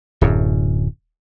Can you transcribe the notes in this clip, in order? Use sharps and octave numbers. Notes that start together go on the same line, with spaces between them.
D1 F#2